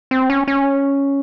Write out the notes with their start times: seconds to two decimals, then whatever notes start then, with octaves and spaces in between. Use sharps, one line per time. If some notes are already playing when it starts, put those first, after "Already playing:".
0.11 C4
0.30 C#4
0.48 C#4